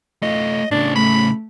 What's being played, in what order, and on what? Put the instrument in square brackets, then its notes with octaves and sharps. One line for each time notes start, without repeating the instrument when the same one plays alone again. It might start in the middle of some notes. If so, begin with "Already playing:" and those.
[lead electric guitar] A3 F4 [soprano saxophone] D#5
[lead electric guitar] A2 C#3 [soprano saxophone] D4
[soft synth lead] A3 [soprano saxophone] B5